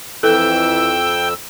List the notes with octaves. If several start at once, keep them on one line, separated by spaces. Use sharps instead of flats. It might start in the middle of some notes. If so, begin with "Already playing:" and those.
F2 E3 A4 G5 E6